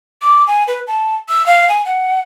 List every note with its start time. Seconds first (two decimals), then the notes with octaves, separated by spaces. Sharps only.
0.22 D6
0.47 G#5
0.68 B4
0.87 A5
1.29 E6
1.46 F5
1.69 G#5
1.85 F#5